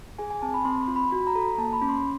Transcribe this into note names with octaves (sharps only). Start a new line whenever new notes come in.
G#4 G#5
G#5
C4 A5
B5
C4 C6
C6
F4
B5
F#4 B5
A#5
A4
A#3 A5
B5
C#4
C6